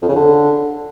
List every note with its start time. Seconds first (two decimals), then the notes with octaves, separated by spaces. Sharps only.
0.02 F2
0.09 C#3
0.15 D3